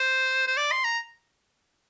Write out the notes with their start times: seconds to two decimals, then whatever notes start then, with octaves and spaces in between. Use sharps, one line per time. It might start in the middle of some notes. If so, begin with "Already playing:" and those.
Already playing: C5
0.47 C5
0.57 D5
0.72 C6
0.84 A#5